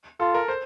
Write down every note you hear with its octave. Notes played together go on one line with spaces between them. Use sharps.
F4 A4
A#4
C5